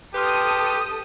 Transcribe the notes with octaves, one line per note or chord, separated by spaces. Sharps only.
G4 A4 B4 C6 D#6 F6